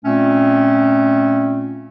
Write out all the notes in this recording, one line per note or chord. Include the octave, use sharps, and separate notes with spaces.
A#2 A3 C4 C#4